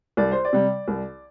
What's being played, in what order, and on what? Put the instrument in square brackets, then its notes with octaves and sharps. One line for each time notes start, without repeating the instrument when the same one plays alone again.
[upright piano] C2 D5
C5
D5
C3 G3
C2